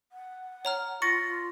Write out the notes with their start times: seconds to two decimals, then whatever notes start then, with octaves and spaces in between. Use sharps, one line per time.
0.12 F#5
0.65 C#5 A#5 F6
1.02 F4 C#6 A6 A#6 C#7